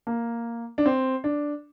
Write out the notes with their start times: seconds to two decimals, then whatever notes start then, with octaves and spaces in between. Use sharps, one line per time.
0.07 A#3
0.78 D4
0.86 C4
1.24 D4